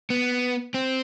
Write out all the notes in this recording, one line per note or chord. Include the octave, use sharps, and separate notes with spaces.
B3
C4